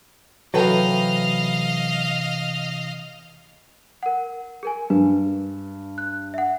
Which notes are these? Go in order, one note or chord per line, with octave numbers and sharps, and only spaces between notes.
C3 E3 F#3 A4 B4 D#5 F5 G5
A#4 F#5
G#4 A#4 G#5
G2 B4
F#6
E5 F#5